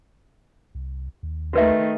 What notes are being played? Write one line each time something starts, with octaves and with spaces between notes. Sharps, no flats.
C2
D#2
D#3 A3 F#4 B4 E5